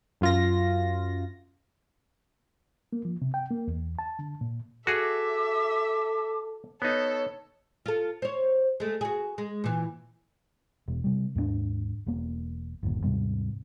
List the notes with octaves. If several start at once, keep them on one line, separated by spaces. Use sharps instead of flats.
F#2 F4 A#6
A#3
F3
C3
G5
A#3
E2
A5
D3
A#2
F#4 G#4 A4 E5 D6
B3 D#4 A4 C#5
F4 A4
C5 C#5
G#3 A3
F#4 G#4
G#3
A#2 E3
E1
C3 G3
D#2 G#2 A#3 D4
E1 A#3
G1 D#2 A#2
D#2 G#2 C3 G3